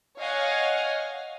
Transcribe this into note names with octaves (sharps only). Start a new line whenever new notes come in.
C#5 D#5 F5 F#5 G#5